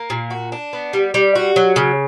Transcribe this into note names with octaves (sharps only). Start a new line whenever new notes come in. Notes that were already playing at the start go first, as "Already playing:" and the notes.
Already playing: A#3
A#2
F#4
D4
B3
G3
G3
F#4
F#3
C#3